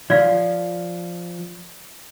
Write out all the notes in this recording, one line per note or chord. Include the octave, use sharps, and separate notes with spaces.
F3 D5 F5